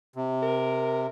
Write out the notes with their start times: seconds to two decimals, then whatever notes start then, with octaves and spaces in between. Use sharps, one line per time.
0.16 C3
0.43 A#4